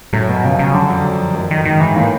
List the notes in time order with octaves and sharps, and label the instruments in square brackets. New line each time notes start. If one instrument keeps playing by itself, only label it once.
[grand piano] F#2 [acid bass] A2
[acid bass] B2
[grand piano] F2 [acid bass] C#3
[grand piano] F#2 [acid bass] C#3
[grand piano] F#2 [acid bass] D3
[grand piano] F2
F#2
[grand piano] F#2 [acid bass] D#3
[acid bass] D#3
[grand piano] G#2 [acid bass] D#3
[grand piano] G#2 [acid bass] E3
[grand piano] A2 [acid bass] A#3